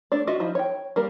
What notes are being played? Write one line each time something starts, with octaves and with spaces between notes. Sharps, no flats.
A3 D4 D5
F4 F#4 D#5 E5
F3 D#4 E4
C#5 G5
G3 A#3 A#4